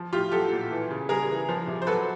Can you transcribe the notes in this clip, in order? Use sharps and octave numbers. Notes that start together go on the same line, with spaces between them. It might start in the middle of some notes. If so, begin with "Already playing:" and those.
Already playing: F3
A2 F4 G4
F#3 G4 A4
A#2
E3
C#3
G3 G#4 A#4
E3
F3
C3
C5
F#3 A4 B4